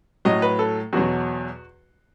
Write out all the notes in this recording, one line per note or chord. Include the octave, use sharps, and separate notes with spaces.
A2 F#3 D#5
B4
A4
E2 B2 F#3 F#4